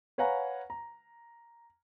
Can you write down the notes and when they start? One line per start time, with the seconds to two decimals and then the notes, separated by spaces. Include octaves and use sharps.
0.18 B4 C#5 F5 F#5 G#5 A#5
0.70 A#5